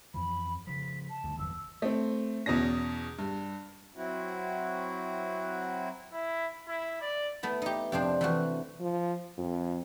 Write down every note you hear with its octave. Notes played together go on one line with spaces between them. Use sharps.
F2 E3 F3 B5
C#3 F3 B6
A5
D2 G2
G1 E2 B2 E6
A3 C4
E2 B2 C#4 A#6
G2
F#3 C4 E4 F#4
E4
E4
D5
A3 B3 E4
D#4 G4
F2 C3 D4 C5
E3 A3 F#4
F3
F2